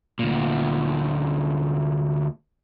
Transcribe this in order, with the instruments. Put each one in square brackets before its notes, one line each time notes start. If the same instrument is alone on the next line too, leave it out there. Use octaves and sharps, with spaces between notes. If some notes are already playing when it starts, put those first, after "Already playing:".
[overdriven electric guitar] D2 A#2